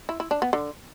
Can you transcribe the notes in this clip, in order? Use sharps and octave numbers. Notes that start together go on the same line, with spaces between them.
E4
E4
D4
B3
D3